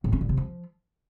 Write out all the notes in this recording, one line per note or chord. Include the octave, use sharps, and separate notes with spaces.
A2
C#4
A#2
C3
F3